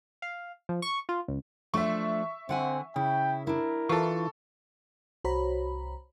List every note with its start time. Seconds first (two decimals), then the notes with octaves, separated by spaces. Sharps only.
0.22 F5
0.69 F3
0.82 C#6
1.09 F4
1.28 C#2
1.74 F3 A3 D4 E5 C#6
2.49 D3 C4 F#5 G#5
2.96 C#3 E4 G5
3.47 D4 E4 A#4
3.89 E3 F4 A4 C#6
5.24 C2 F#4 C5 C#5 A#5 B5